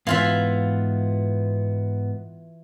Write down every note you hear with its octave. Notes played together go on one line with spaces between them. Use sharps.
G#2 E3 B3 F4 E5 F5